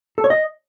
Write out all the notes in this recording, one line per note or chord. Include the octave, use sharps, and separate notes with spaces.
A4
C#5
D#5